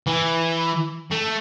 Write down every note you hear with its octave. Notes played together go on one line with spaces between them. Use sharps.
E3
A3